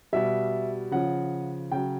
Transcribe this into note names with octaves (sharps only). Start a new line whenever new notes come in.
B2 G3 E5
C#3 F3 F#5
C#3 F#3 G5